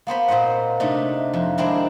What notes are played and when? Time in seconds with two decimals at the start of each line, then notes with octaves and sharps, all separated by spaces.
0.07 A#3 B3 C5 B5
0.28 A#2 C4 C5 D#5 F#5
0.80 C3 A3 D4 D#4
1.33 F2
1.58 D#3 G#3 C4 D4 E4 A#4